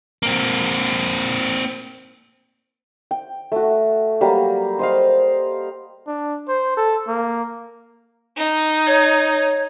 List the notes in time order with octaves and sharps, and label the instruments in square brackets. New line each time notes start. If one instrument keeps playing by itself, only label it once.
[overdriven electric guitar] A#3 C4
[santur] G5
A3 F#4
F#3 G3 A#3 G4
C5 D#5 F5
[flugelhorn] D4
C5
A4
A#3
[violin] D#4
[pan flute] C#5